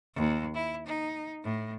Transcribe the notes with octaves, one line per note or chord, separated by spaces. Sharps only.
D#2
E4
D#4
A2